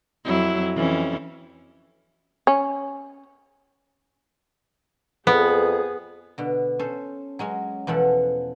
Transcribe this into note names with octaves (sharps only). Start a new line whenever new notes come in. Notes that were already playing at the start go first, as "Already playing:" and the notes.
F2 F#3 E4
F2 E3 C#4
C#4
F2 B3 G#4 A4 B4
B2 D3
C#4 A4 C5
F#3 G#3 C#4
E2 B2 F3 A4 F#5